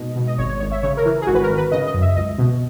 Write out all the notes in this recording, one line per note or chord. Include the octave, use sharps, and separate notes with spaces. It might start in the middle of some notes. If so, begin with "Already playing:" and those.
Already playing: G#2 B2 D#5
B2
D#5
G#1 C#5
C#5
G#1 C#5
E5
C#3 C#5
A#4
E3
G#4
G#1 F#4
B4
A#4
G#1
B4
C#3 D#5
D#5
F#2
E5
C#2 D#5
B2